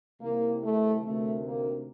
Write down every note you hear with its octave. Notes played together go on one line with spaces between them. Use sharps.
C2 C3 D#3 A#3
A3
D2 C3 D#3 A3
A#3